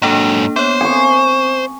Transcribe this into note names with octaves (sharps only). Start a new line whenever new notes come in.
G#2 F#3 A#3 D4 A4
B3 C5 C#5
C4 G#5 C#6